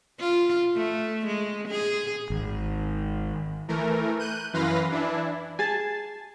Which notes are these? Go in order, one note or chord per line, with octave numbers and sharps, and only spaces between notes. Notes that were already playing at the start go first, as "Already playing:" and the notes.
F4
A3
G#3
G#4
G#1
E3 A3 A#4
F#6 G6 D#7
F#2 E3 B4 F5 C6 A#6
E3 D4 E4
G#4 G#5 A5 A6